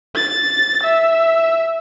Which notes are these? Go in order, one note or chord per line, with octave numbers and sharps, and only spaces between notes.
A6
E5